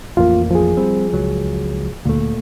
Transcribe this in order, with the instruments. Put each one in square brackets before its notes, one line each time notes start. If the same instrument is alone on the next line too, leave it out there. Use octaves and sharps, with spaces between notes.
[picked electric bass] A1 F2 A#3 [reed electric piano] F4
[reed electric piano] F3 G#4
[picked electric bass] G3 C4
C#2 F#3
[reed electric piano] D2 [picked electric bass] A#2 A3